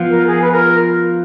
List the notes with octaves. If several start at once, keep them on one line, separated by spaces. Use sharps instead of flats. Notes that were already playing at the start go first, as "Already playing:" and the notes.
Already playing: F3 B3 F4
A#4
G#4
B4
A#4